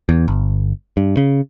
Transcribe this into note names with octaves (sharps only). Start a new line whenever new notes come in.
E2
G1
G2
C#3